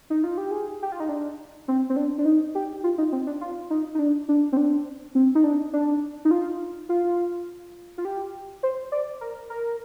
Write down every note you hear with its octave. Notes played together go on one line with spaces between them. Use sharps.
D#4
F4
G4
G#4
G4
F4
D#4
D4
C4
C4
D4
D4
D#4
G4
F4
D#4
C4
D4
F4
D#4
D#4
D4
D4
C4
D4
C4
D#4
D4
D4
D#4
F4
F4
F4
G4
C5
D5
A#4
A#4